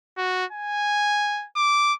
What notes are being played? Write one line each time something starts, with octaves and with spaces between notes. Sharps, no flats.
F#4
G#5
D6